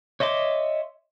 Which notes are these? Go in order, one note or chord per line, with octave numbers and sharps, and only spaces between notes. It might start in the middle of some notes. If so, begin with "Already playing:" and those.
C#5 D#5 E5 C6 D6